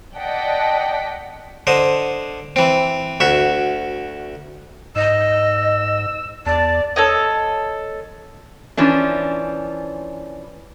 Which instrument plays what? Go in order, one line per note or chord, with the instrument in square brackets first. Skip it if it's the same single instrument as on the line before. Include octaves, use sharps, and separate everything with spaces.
[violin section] D5 D#5 F#5 G5 A5 B6
[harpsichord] D3 C5 D#5
E3 C4
D2 F#4 E5
[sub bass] G#2 [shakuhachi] D#5 [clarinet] E6
[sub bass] E2 [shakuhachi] D5 [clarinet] A5
[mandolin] A4 C#5 D#5
[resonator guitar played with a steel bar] E3 F3 C#4 D4